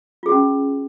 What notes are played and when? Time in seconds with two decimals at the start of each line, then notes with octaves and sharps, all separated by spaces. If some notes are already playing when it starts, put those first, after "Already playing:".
0.23 F4
0.26 G#4
0.29 F#4
0.32 C#4